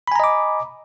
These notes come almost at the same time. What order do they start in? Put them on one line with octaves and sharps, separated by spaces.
B5 G#5 A#5 D#5 D6